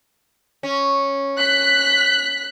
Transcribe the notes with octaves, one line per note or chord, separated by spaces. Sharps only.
C#4
F#6 B6